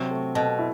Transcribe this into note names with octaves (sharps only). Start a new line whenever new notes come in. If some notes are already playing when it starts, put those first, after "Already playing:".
Already playing: C3 F#3 C4
A3
B2 A4
E4